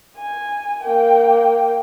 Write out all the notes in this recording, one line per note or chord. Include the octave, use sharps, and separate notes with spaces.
G#5
A#3 G5